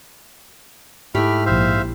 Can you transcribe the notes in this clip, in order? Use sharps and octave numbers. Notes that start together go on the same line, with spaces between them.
G#2 A3 E4 G4 B5 F6
A#1 C5 E5 F5